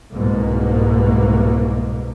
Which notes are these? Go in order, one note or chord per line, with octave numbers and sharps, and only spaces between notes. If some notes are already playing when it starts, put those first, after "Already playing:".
C2 G#2 B2 A#3